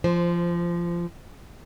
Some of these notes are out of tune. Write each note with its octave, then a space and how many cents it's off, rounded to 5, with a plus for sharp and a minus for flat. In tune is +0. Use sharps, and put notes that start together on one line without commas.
F3 -20 C5 +0